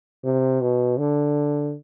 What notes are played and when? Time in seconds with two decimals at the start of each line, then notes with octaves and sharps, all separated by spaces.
0.24 C3
0.61 B2
0.98 D3